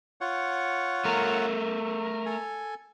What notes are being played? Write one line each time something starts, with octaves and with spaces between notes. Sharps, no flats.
F4 C#5 F#5
A3 A#4
A4 G#5